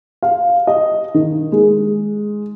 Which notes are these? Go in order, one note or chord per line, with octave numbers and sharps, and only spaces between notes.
F5
D#5
D#3
G#3